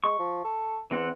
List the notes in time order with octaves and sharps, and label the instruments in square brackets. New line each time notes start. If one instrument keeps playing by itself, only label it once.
[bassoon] G#3 [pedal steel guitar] C#6
[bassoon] F3
A4
[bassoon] E2 [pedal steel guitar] E3 C4 F#5